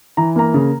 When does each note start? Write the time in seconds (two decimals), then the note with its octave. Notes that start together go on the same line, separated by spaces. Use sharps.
0.17 E3 A#5
0.36 A#3 A#5
0.54 C#3